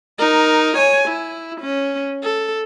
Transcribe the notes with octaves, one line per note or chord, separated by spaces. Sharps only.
D#4 A#4
C#5 G#5
E4
C#4
A4